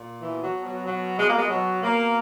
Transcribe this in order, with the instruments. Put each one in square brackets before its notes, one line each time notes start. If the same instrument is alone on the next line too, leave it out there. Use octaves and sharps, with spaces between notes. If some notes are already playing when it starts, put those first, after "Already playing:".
Already playing: [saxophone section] A#2
B2 E3
F#3
B2
F#3
B2 F#3
B2 G#3
A#3
G#3
B2 F#3
B2 A#3